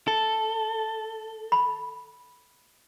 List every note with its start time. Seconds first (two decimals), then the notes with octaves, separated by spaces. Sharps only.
0.08 A4
1.52 B5